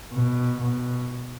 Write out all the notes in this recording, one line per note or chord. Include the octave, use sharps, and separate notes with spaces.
B2
B2